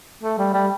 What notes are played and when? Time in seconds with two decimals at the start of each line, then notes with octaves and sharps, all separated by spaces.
0.23 A3
0.38 G3
0.54 G3